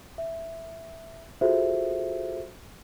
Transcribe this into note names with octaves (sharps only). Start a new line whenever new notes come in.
E5
F4 F#4 G#4 A4 C5 E5